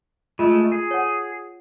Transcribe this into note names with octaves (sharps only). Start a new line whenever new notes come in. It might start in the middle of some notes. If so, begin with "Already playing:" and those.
G#3 A3 F4
G#4
C#5 F#5